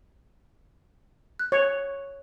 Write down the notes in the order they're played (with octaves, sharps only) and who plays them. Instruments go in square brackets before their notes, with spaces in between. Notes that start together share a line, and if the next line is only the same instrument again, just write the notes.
[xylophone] F#6
[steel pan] C#5